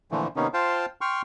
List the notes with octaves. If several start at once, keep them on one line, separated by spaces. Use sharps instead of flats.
A#2 D3 E3 F3 A3
C3 D#3 A#3 B3 C#4 D#4
F4 C5 F5 G5 A5 C6
G5 C6 C#6 F6